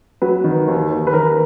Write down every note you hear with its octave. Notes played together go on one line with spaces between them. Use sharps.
F#3 B4
D#3
D#2
D#2
B4
D#2 A#4